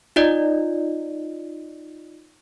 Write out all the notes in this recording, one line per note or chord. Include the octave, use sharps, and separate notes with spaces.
D#4 F4 D5 D#5